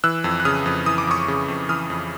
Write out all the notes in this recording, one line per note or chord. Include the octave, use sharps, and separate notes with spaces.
E3 E6 F#6
F2
F#6
C#3 D#6 F6
F2
E3 D#6
D6
F2 C#6 D#6
C#3
F2
E3 D#6 F6
F2